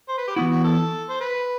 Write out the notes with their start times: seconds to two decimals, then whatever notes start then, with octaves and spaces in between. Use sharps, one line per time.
0.09 C5
0.18 B4
0.28 G4
0.36 E3 B3 E4 F#4
0.51 F#4
0.64 A4
1.10 C5
1.21 B4